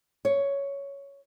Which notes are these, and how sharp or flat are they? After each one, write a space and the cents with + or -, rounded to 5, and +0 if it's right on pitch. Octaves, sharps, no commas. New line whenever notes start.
C#5 +5